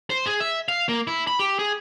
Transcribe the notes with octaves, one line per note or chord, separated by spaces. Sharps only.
C5
G#4
E5
F5
A#3
E4
B5
G4
G#4